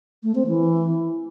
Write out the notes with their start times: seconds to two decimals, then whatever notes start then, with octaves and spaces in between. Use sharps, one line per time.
0.23 A3
0.35 C4
0.47 E3